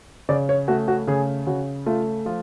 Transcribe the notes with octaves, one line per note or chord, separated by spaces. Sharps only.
C#3 D5
C#5
A3 F#4
F#4
C#3 G#4
C#3 F#4
A3 F4
F3 F4